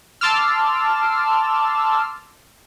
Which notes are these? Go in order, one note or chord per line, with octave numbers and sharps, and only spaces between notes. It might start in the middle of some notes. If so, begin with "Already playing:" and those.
A5 C6 D6 E6 F6